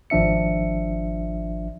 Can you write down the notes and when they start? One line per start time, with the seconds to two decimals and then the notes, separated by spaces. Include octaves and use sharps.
0.10 G#1 F3 D4 E5 C#7